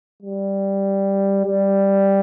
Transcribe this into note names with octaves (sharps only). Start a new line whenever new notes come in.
G3
G3